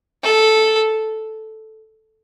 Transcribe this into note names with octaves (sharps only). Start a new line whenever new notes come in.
A4